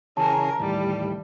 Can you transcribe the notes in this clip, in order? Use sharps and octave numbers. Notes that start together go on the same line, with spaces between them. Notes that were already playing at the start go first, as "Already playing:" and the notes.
C#3 E3 G#4 A#4 C#5 A5
D#2 A2 E3 G3